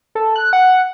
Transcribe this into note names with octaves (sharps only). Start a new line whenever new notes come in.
A4
F#6
F#5